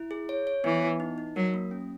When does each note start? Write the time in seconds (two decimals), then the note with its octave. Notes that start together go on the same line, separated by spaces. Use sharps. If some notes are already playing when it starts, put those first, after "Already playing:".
Already playing: E4
0.11 G#4
0.29 C#5
0.47 C#5
0.64 E3 B3
0.83 B3
1.00 D#4
1.18 D#4
1.36 F#3 A#4
1.54 A#3
1.71 C#4